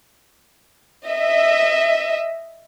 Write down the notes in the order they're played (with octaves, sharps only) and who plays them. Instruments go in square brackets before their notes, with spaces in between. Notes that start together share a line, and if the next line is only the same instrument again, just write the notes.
[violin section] D#5 E5